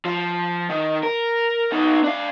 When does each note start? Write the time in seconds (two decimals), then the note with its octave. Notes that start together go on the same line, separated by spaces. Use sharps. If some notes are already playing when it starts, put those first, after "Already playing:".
0.06 F3
0.70 D#3
1.03 A#4
1.72 B3 D#4
2.04 D4 F5